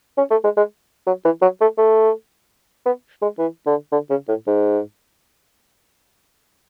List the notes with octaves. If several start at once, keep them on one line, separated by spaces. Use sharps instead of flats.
C#4
A3
G#3
G#3
F#3
E3
F#3
A3
A3
B3
G#3
E3
D3
D3
C#3
A2
G#2